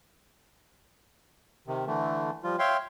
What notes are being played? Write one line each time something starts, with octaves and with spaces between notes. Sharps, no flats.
C3 D#3
D3 E3 A3
F3 G3 F4
C#5 E5 F5 G5 C6